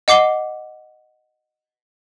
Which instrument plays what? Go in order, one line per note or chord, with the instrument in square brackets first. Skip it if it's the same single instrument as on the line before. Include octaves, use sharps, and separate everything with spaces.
[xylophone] D#5 F#5 D6 C7 G7